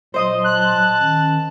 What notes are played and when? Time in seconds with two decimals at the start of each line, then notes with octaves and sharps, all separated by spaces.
0.14 A#2 F#3 C5 D#5 C6 D#6
0.44 A5 F#6
1.00 D#3 C#4